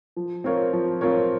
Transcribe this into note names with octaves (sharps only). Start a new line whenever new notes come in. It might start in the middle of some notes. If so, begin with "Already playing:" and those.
F3
C4 F4 A#4 C#5
F3
C4 F4 A#4 C#5